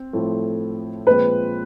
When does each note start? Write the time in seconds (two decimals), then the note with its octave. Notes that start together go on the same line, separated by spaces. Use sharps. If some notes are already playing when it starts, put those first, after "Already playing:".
Already playing: C4
0.13 A2 F3 A3 C4
1.07 A#2 F3 G#3 C4 B4